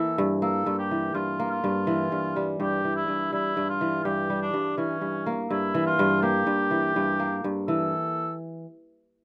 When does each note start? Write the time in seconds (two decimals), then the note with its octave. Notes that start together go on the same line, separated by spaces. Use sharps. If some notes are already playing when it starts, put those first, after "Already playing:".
Already playing: E3 A#3 A4
0.18 G2
0.42 A#3 A4
0.66 G2
0.79 G4
0.91 E3
1.14 G2 F4
1.39 A#3
1.51 F4
1.64 G2
1.87 E3
2.12 G2
2.36 G3
2.60 G2 G4
2.85 E3
2.96 E4
3.08 G2
3.32 G3 E4
3.57 G2
3.69 F4
3.81 E3
4.05 G2 G4
4.30 G3
4.42 D4
4.54 G2
4.77 E3 C#4
5.02 G2
5.26 A#3
5.50 G2 E4
5.74 E3
5.87 F4
5.99 G2
6.22 A#3 G4
6.47 G2
6.71 E3
6.96 G2
7.20 A#3
7.44 G2
7.68 E3 A4